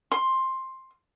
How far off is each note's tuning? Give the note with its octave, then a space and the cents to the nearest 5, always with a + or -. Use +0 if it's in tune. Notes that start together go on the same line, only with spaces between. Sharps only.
C6 +10